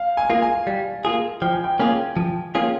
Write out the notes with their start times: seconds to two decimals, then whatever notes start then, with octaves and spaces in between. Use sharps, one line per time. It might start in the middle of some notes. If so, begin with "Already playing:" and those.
Already playing: F5
0.17 G#5
0.30 A#3 F4 G#4
0.42 G#5
0.67 G3
1.05 A#3 F4 G#4
1.42 F3 G5
1.53 G#5
1.64 G5
1.79 A#3 C#4 F4 G#4 G#5
2.17 F3
2.55 A#3 C#4 F4 G#4